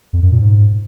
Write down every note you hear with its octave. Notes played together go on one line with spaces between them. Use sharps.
F2
F#2
A#2
G#2